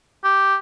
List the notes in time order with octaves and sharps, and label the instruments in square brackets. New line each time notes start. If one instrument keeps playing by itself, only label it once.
[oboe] G4